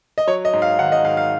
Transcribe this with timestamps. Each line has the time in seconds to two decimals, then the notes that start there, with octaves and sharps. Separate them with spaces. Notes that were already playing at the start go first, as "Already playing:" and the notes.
0.18 D#5
0.27 F#3 C#5
0.45 D#5
0.53 G#2
0.62 F5
0.79 D#3 F#5
0.92 D#5
1.05 G#2 F5
1.17 F5